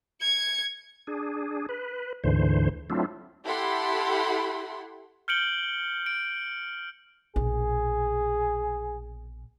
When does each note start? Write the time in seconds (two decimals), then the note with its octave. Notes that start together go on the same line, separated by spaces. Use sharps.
0.21 G#6 C#7
1.07 D4 G#4
1.69 B4
2.24 D2 G#2 D3 E3 C5
2.90 F#3 A3 C4 D4 E4 F4
3.46 E4 G4 A4 F#5 B5 C6
5.28 F6 G6 C#7 D7 F#7 G7
6.06 D7
7.36 A#1 B2 G#4